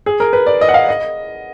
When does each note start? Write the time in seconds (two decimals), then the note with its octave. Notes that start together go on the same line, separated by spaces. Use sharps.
0.06 G#4
0.20 A#4
0.33 B4
0.47 D5
0.61 D#5
0.69 F#5
0.74 F5
0.89 D#5